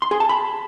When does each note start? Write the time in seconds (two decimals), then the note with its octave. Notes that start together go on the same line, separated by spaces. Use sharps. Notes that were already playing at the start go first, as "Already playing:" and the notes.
0.02 C6
0.11 G#4
0.20 A5
0.29 B5